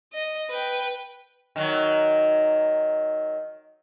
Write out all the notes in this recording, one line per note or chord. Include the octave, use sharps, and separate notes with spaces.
D#5
B4 G5
D#3 F#3